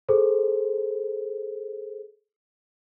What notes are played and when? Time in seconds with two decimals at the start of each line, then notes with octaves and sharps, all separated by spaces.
0.09 G#4 A4 C5